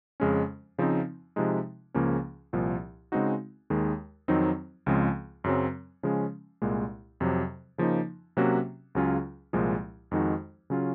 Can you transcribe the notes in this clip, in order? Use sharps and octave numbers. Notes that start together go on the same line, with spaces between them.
F2 C#3 G#3 C#4
C#3 F3 C4 D#4
C3 F3 G#3 D#4
C#2 C#3 F3 A#3 C#4
C2 A#2 F3
C#3 G#3 C4 D#4 F#4
D#2 D#3 G#3
F2 D#3 F#3 C4 D#4
C#2 C#3 F3 G#3 C4
F#2 C#3 F#3 C4
C#3 F3 G#3 C#4
C2 A#2 G#3
F2 C3 F#3
C#3 F3 A#3 D#4
C3 F#3 A#3 C#4 F#4
C#2 C#3 F#3 C#4 F4
C2 A#2 F3 G#3
F2 D#3 G#3 D#4 F#4
C#3 F#3 C#4 F4